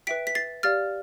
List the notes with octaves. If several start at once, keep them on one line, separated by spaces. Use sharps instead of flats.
B4 E5 G5 B6 D7
B6
A6 C7
G4 D5 F5 F6 A6